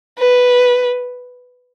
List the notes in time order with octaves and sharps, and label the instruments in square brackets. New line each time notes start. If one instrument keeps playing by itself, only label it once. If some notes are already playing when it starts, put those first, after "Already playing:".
[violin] B4